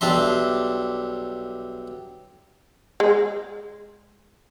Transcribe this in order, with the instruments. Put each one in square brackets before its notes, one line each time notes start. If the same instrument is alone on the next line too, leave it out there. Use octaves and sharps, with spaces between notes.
[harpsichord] B1 G3 D4 E5 C6
[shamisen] G#3